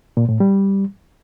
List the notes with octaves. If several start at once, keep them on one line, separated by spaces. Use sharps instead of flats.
A#2
A2
G3